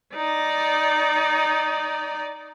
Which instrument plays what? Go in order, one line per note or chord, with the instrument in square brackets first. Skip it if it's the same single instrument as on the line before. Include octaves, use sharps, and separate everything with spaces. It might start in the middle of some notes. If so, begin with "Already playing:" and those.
[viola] D#4 D5